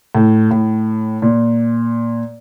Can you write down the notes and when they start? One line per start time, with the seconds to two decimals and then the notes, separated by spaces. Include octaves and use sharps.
0.15 A2
0.51 A2
1.22 A#2